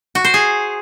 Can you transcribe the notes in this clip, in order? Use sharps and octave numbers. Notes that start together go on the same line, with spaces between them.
F#4
C5
G#4